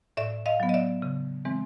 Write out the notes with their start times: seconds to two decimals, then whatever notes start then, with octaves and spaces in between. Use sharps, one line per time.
0.17 A2 D5 E5
0.46 D#5 F5
0.60 F#3 B3
0.69 D#5
0.74 D5 E5
1.02 C#3
1.45 E3 G#3 C4